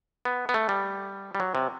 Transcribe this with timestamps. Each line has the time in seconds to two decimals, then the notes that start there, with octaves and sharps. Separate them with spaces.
0.25 B3
0.49 B3
0.54 A3
0.69 G3
1.35 G3
1.40 F#3
1.55 C3